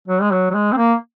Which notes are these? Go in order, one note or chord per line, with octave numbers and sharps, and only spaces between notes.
F#3
G#3
F#3
F#3
G#3
C4
A#3